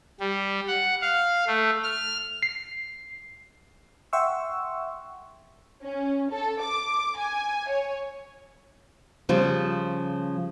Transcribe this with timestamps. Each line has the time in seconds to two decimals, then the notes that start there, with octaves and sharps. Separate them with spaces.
0.20 G3
0.68 F#5
1.02 F5
1.47 A3
1.84 F6
2.43 C7
4.13 E5 F#5 G5 C6 C#6 E6
5.83 C#4
6.31 A4
6.62 D6
7.17 G#5
7.69 C#5
9.29 C#3 F3 G3